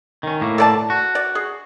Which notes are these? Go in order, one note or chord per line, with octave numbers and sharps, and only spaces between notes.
D#3 C#4
A2 A#3
A4 D5 A5
F#4
D5
G#4